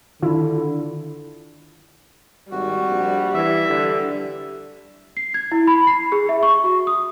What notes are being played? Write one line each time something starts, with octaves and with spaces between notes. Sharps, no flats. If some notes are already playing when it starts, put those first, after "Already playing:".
D3 D#3 D4 E4 F4
G#1 G3 F#4
A#1
E3 E5
D3
C7
G#6
E4
B5
C7
G#4
E5
C#6
F#4
D#6